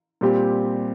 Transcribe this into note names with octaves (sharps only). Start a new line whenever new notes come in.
A#2 G3 C4 G4